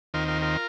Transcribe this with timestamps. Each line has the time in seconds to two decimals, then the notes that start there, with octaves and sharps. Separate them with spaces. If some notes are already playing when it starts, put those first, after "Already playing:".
0.14 D#2 D#3 C4 F4 A#4
0.28 F4 A#4
0.42 F4 A#4